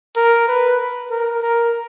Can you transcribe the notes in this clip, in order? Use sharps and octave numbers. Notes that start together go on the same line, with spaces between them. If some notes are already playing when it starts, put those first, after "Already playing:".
A#4
B4
A#4
A#4